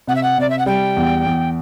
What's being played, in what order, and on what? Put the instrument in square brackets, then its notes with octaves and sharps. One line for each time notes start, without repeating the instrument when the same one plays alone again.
[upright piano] C3 [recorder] F#5
[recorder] E5
F#5
[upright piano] C3 [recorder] D5
[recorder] E5
F#5
[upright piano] G3 [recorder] G5
[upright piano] E2
E2